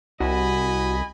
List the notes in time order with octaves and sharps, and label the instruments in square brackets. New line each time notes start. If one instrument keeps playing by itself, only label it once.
[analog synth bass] C2 [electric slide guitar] F#4 [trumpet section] D#5 G#5 B5